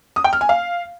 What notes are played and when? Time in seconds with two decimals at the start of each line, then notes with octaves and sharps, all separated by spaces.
0.16 D#6
0.24 G5
0.33 F6
0.41 G#5
0.49 F5